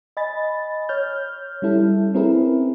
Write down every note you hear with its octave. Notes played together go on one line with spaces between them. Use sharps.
D#5 G#5 B5 A6
C#5 F6 G6
G3 C#4 E4 A4
C4 C#4 E4 G#4 A#4 B4